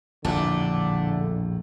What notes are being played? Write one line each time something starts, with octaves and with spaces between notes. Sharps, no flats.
A#1 E2 A2 D3 A3 D4